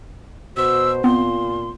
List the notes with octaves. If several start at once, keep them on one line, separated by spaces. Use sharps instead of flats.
B2 F#4 C5 E6
A#2 B3 C4 F4 C6